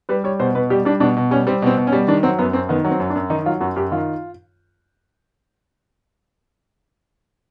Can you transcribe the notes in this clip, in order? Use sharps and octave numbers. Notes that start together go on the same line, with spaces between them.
G3 B4
G3 C#5
B2 C5
B2 B4
G3 G4
G3 D4
B2 D4
B2
G3 C#4
G3 C4
B2 C4
B2
C#4
G3
D#3 D4
F#3 C4
F#2 B3
F#2 C4
D#3 B3
F#3
C4
F#2
D4
F#2
D#3 D#4
F#3 F4
F#2 F#4
F#2 G4
D#3 F4